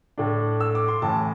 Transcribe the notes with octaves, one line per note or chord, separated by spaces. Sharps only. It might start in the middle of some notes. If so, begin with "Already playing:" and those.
A2 A3 D4
E6
D6
C6
A1 A2 E3 A5